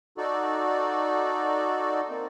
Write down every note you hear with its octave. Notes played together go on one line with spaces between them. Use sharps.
D#4 F#4 A4 D5
A#3 C4